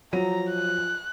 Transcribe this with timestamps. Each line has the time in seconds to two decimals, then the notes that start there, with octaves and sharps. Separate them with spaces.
0.13 F3 F#3 A#5 D#7
0.50 F#6